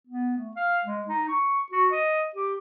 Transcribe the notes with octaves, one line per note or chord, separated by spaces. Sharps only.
B3
A3
F5
G#3
D#4
C#6
F#4
D#5
G4